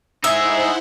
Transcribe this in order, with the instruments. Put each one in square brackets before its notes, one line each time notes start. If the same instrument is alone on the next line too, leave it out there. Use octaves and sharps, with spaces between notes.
[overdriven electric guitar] D#4 G#4 [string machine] E4 C5 F#5 [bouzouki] E5